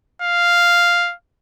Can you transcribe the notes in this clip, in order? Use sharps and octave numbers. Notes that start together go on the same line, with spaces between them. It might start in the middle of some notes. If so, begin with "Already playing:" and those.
F5